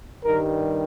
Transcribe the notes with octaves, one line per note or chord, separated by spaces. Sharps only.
G2 D#3 G3 A#4